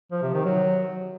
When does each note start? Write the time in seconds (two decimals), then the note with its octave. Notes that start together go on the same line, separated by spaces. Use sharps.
0.12 F3
0.23 C3
0.34 D#3
0.45 F#3